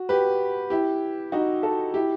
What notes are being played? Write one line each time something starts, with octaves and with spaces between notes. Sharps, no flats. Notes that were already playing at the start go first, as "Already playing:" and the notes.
Already playing: F#4
G4 B4
E4 G4
D#4 F#4
F#4 A4
E4 G4